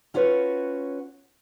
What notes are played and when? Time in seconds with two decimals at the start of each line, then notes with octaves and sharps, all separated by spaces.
0.14 C#4 F4 F#4 B4 C#5